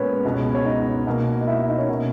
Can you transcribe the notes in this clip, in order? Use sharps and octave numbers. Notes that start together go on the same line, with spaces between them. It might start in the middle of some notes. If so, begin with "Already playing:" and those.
Already playing: A#2 G#3 B3 C#4 A#4 B4 C#5
C#2 B2 G#3 B3
C#5
D#4 D#5
B2 A#3
D#5
E4 E5
E4 E5
D#4 D#5
C#4 C#5
B2 A#3